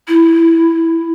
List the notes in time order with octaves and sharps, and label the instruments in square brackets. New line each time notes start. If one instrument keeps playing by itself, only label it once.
[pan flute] E4